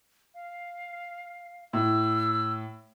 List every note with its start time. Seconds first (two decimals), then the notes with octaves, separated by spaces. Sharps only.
0.34 F5
1.73 A2 E6